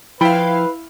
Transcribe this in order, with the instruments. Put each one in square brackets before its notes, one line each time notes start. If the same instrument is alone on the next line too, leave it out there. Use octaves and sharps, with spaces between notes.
[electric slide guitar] F3 G5 [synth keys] E4 F5 [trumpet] B4 [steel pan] B5